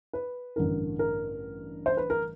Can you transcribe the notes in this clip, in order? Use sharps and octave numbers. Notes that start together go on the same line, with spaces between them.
B4
A1 G2 D3 A#4
A#4
C5
B4
A#4